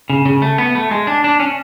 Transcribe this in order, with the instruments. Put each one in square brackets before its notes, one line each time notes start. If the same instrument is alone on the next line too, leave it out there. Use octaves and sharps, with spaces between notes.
[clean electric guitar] C#3
C#3
A3
B3
A3
G#3
D4
D4
C#4